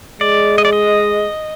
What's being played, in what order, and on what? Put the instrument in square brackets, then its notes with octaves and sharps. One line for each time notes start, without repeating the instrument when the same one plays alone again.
[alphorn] G#3 [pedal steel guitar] D5
[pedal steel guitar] D#5
D5
D#5